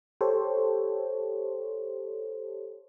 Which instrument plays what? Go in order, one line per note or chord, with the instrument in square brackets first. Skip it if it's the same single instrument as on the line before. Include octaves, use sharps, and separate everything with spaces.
[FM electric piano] G4 A4 C5 C#5